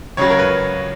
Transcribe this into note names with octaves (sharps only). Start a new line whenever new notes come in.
C#2 C#3 F#3 C#5
A#4
B4